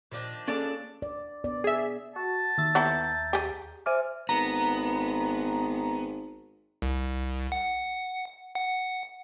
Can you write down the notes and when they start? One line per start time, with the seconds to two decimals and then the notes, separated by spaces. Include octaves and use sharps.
0.12 A#2 D#3 F3 D4
0.48 A#3 C#4 G#4 A4 D5
1.02 D5
1.44 B3 D5
1.64 G#4 E5
2.16 F#4 A5
2.58 D#2 E5 A6
2.75 B3 E4 A4 A#5 G6
3.33 G4 G#4
3.86 C5 D5 E5 G#5 F6
4.29 G#1 B3 A#5
6.82 C2
7.52 F#5
8.55 F#5